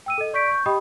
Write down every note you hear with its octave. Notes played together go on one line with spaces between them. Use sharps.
G5 E6 D#7
A4 D#5
D5 C#6 G6 B6 D7
C#6 G6
G4 D#5 G5 B5 D#6